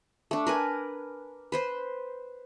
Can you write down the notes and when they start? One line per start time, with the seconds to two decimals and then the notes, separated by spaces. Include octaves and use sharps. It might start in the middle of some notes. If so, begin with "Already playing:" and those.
0.31 A3 D4
0.47 A#4 B4 G#5
1.52 B4 C5 C6